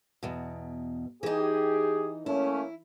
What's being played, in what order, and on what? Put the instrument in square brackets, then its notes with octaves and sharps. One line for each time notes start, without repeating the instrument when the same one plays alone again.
[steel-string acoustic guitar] E2 B2
[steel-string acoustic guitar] E3 D#4 [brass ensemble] G4 G#4
[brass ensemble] A3 A#3 C#4 [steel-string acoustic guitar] E4